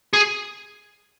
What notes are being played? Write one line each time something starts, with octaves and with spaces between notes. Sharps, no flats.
G#4